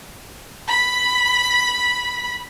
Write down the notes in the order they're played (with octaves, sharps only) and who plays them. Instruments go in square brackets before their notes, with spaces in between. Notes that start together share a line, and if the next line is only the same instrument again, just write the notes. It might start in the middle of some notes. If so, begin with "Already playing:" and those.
[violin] B5 B6